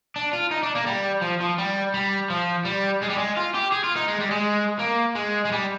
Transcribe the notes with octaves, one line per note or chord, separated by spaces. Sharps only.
D4
F4
D#4
D4
A#3
G3
F3
F3
G3
G3
F3
G3
G#3
G3
G#3
F4
G4
G#4
F4
D#4
G#3
G3
G#3
A#3
G#3
G#3
G3